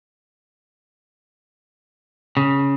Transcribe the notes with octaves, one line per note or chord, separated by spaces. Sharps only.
C#3